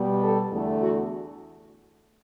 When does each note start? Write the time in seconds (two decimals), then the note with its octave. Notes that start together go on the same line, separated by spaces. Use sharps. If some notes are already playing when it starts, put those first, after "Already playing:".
Already playing: B2 G3
0.22 A4
0.52 E2 D3 A3
0.82 F#4